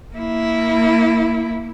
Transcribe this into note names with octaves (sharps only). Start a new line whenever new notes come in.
A#3 E4